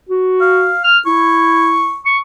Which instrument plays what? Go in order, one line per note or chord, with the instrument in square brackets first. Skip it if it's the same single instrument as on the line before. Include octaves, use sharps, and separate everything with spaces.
[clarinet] F#4
[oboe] F5
[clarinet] F6
[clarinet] E4 [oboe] C#6
[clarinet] C#6